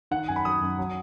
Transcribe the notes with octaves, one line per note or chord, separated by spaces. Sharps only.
D#3 F#5
F#2 G#5
B5
F#3 D#6
F#2
F#3